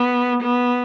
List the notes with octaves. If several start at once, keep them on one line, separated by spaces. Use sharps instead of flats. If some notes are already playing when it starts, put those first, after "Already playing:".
Already playing: B3
B3